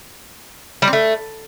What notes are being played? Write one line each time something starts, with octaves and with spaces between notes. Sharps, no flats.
G3
C4
A3